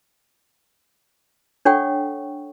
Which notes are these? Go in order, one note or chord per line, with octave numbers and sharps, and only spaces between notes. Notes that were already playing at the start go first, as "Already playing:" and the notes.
D4 A4 C#5 F#5 G5 C#6